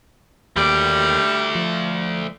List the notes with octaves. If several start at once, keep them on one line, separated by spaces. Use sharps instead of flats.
D#2 G3 A3 D5
F3